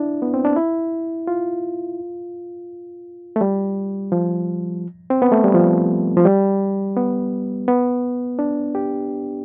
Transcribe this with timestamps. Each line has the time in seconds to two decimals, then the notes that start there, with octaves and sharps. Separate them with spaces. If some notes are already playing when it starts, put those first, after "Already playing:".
Already playing: D4 E4
0.22 B3
0.34 C4
0.45 D4
0.56 E4
1.27 F4
3.36 A3
3.41 G3
4.12 F3
5.10 C4
5.22 B3
5.32 A3
5.44 G3
5.54 F3
6.17 F3
6.25 G3
6.97 B3
7.68 B3
8.39 D4
8.75 G4